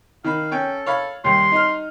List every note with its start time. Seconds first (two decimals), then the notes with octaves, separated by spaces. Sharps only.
0.24 D#3 F5 B5
0.52 C#4 A4 G5
0.86 C#5 F5 B5
1.24 D#2 G3 C6
1.52 D#4 F6